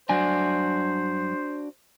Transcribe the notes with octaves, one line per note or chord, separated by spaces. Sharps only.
G2 F#3 D4 F#4 C5 G#5